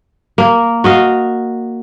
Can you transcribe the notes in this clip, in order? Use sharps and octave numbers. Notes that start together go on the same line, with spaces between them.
A#3
F#4 D#5 F5